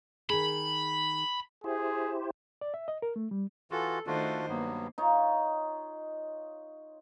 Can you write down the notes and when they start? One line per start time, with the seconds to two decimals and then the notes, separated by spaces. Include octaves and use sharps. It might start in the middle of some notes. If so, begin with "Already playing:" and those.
0.30 D#3 G#4 B5
1.64 E4 G4 G#4 C5
2.61 D5
2.74 E5
2.88 D#5
3.02 A#4
3.16 A3
3.31 G3
3.71 E3 F4 F#4 A4
4.07 D#3 A3 D4 F4 F#4 C5
4.48 G2 F#3 A#3 B3
4.98 D#4 F4 C#5